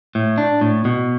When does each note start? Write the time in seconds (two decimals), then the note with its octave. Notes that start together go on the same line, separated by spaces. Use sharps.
0.15 A2
0.38 D4
0.61 A2
0.85 B2